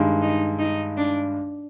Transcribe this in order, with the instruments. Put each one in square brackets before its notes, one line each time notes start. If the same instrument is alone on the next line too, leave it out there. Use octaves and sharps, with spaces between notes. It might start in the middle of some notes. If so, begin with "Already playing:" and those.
Already playing: [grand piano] G2 D#3 G#3
[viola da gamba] D#4
D#4
D4